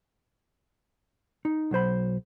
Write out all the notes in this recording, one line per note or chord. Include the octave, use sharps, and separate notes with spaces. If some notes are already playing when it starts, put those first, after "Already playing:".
D#4
B1 F#3 C5 B5